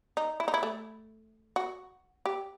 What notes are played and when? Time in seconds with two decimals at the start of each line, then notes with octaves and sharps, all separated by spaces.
0.17 D#4
0.40 E4
0.48 D#4
0.54 E4
0.63 A3
1.56 F#4
2.26 G4